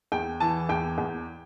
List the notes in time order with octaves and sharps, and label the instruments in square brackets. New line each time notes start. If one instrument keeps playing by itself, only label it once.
[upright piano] E2 G5
E3 A5
E2 G5
E2